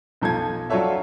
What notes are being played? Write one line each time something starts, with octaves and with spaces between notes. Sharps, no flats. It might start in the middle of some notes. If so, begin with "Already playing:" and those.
B1 F3 A4 G#6
F#3 D4 F4 A4 C#5 E5